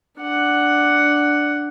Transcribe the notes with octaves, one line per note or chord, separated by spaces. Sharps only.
D4 F#5